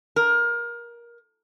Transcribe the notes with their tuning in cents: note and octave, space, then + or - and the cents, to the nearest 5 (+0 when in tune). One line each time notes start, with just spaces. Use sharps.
A#4 +20